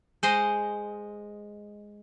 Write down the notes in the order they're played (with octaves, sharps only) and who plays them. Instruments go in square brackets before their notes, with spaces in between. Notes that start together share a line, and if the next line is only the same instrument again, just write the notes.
[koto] G#3 C5 D#5